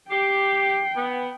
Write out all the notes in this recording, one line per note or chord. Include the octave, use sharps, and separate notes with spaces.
G4 G5 C7
B3